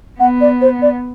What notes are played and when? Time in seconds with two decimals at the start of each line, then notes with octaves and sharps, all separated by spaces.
0.20 B3 F#5
0.41 D5
0.61 C5
0.82 D5